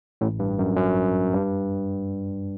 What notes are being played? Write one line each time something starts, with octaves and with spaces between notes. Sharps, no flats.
A1 A2
G2
F#2
F#2
G2